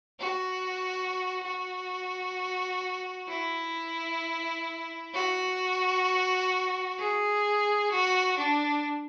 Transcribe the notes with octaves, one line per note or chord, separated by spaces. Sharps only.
F#4
F#4
E4
F#4
G#4
F#4
D4